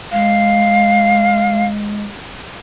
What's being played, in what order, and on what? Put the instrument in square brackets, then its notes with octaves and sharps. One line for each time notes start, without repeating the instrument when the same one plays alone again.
[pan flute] G#3 [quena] F5